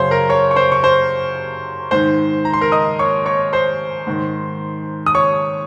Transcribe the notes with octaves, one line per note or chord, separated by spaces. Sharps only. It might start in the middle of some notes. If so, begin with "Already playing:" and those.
Already playing: F#2 C#3 C5 C#5 C6
A#4 A#5
C#5 C#6
C#6
C5 C6
C#6
C5 C6
G#2 D#3 C5 C6
A#5
C6
A#4 A#5
D#5 D#6
C#5 C#6
C#5 C#6
C5 C6
G#2 D#3
D#6
C#5 C#6